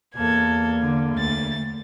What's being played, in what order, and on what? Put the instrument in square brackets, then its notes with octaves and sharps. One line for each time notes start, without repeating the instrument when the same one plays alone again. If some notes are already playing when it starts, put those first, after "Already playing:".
[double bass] E2 A#3 [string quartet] A4 G#6
[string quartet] D3
D2 A6